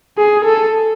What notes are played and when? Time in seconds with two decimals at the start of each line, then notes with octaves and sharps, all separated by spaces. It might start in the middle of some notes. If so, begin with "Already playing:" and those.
0.18 G#4
0.45 A4